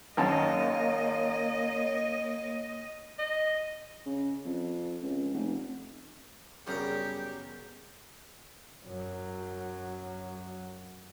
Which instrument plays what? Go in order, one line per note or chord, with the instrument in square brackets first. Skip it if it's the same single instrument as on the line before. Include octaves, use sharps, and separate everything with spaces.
[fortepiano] G#1 F#2 A5 [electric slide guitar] A#3 [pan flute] C#5 [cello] D#5
[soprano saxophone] D#5
[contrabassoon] C#3
F2
C#2
F1
[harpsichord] F#2 A#4 [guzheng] C#3 B3 A#5 [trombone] G3 [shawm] G4
[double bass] F#2 F#3